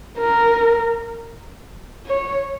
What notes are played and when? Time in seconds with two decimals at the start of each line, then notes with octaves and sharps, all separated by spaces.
0.19 A#4
2.06 C#5